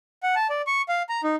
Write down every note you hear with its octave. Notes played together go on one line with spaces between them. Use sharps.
F#5
A5
D5
C#6
F5
A#5
D#4